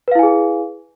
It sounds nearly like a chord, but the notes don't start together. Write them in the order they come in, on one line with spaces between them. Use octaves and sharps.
B4 F5 E4 G#5 G#4